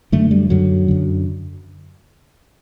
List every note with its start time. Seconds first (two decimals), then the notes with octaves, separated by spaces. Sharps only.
0.12 F#2 D3 A3
0.31 G3
0.50 F#2 D3 F#3
0.88 F#2 D3